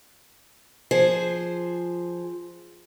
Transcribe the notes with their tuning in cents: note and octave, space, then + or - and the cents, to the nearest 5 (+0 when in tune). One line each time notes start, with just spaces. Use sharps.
F3 +0 G#4 +0 C5 +0